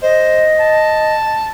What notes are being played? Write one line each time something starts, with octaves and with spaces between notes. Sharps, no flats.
C5 D#5
A5